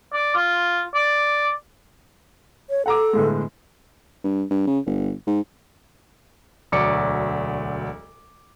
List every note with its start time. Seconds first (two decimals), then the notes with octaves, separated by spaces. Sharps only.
0.13 D5
0.35 F4
0.95 D5
2.70 C#5
2.86 A4 F#5 A#5 D6
3.13 G1 A2 G#3
4.24 G2
4.50 G2
4.67 C#3
4.86 G1
5.27 G#2
6.72 E1 D2 F#3 D5 D6 C#7